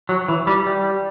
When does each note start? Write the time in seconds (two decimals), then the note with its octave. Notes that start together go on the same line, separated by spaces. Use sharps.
0.09 F#3
0.28 E3
0.47 G3
0.67 G3